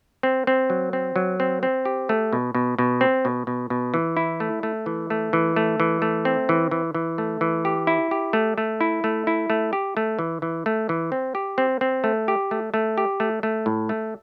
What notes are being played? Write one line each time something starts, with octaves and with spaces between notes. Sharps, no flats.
C4
C4
F#3
C4
F#3
C4
C4
G4
A3
B2
B2
B2
C4
B2
B2
B2
E3
E4
A3
A3
E3
A3
E3
A3
E3
A3
C4
E3
E3
E3
A3
E3
G4
E4
G4
A3
A3
E4
A3
E4
A3
G4
A3
E3
E3
A3
E3
C4
G4
C4
C4
A3
G4
A3
A3
G4
A3
A3
A2
A3